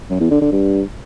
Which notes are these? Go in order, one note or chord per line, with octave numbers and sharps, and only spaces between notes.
F#2
E2
D3
D3
G2